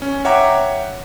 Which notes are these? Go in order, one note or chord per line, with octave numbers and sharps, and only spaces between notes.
C#4
C#5 E5 F#5 G5 A#5 D6